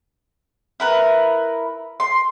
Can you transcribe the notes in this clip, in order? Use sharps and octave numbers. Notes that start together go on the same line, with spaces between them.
E4 A#4 B4
C6